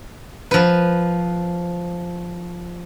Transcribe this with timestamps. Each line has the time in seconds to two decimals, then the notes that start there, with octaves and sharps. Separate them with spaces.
0.51 F3 B4